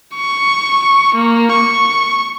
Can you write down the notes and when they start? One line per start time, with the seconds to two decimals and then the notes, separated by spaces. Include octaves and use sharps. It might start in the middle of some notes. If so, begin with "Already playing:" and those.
0.15 C#6
1.15 A#3
1.52 C#6